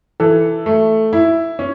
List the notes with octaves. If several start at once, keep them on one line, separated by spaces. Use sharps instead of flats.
E3 A4
A3
E4
C#4